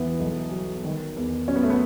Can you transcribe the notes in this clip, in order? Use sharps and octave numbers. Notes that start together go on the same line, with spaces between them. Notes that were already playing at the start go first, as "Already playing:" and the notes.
Already playing: E2 E3 B3
B1
F#3
D#3
E2
F#3 C#4
B3
A3
B3